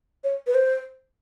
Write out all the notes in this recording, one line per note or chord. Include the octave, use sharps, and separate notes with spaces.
C#5
B4
C5